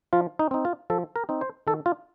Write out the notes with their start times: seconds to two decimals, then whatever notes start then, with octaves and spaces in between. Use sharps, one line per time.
0.13 F3 F4
0.39 D#4
0.51 C4 D#4
0.65 F4
0.90 F3 A4
1.16 A#4
1.29 C4 D#4
1.41 C5
1.67 D#3 A4
1.86 F4